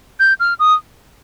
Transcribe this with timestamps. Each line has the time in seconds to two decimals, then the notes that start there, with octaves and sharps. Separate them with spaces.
0.20 G6
0.40 F6
0.59 D#6